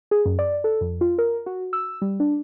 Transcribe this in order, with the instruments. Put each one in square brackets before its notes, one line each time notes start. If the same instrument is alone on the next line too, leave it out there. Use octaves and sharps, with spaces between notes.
[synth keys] G#4
F#2
D5
A4
F2
F4
A#4
F#4
E6
G3
D4